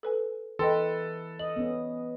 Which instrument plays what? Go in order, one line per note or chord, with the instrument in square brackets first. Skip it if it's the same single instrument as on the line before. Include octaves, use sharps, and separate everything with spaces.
[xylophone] A4 B4 G#5
[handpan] E3 B4 [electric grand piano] A4 [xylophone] D#5 G5 C6
[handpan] D#5 [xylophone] F#7
[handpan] B3 C#4